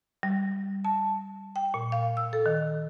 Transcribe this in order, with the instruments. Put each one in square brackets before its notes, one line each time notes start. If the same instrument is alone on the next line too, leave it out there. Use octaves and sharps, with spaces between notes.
[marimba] G3
A5
G5
A#2
F5
E6
A4
D#3